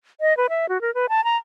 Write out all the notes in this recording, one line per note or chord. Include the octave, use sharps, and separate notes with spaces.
D#5
B4
E5
F#4
A#4
B4
A5
A#5